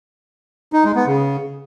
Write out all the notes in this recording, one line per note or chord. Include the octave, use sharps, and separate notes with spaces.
D#4
G#3
B3
C#3